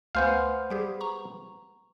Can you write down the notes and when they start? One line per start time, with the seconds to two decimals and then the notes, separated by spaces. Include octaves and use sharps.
0.15 D2 A3 B3 C5 F5 G#5
0.70 G3 G4 G#4
1.01 A#5 C#6